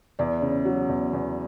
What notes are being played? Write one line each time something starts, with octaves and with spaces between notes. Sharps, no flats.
E2 D5
C#3
F#3
E2
E2